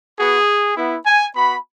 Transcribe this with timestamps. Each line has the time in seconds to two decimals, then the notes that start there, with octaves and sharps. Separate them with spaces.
0.18 B3 F#4 G#4
0.77 B3 E4
1.06 G#5
1.35 B3 F#4 B5